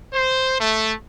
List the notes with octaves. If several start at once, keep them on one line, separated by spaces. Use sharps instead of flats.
C5
A3